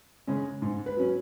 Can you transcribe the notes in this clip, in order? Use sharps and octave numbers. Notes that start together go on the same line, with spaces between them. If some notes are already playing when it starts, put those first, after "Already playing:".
C#3 G#3 C#4
G#2
B4
F#3 C#4